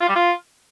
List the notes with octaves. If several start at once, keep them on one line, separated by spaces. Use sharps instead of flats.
F4
G3
F4